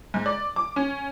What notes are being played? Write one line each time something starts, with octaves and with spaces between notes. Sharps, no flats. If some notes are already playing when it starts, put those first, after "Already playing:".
G#2
D5
D6
C#4